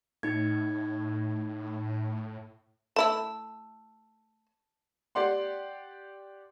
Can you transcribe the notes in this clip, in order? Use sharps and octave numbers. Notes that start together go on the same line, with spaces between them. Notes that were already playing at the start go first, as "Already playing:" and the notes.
A2 D#4 G#6
A3 E4 A5 E6
G4 D5 F#5 C6